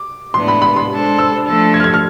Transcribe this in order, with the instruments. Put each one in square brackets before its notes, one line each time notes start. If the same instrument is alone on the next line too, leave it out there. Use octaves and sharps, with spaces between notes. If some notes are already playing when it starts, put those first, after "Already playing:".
Already playing: [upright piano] D6
[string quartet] A2 E3 G#3 B3 D4 [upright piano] C6
[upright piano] B5
B5
C6
[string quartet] G#3 D4 A4 C5
[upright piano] E6
[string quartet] F3 A3 D4 A4
[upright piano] G#6
F6
G#6
F6